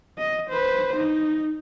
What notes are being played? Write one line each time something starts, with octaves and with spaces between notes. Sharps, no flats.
D#5
B4 C5
D#4